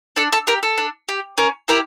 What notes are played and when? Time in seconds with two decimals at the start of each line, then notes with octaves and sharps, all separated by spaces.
0.16 D4 A4
0.32 A4
0.47 G4 A#4
0.63 A4
0.78 D4
1.09 G4
1.38 C#4 A#4
1.68 E4 G4 A#4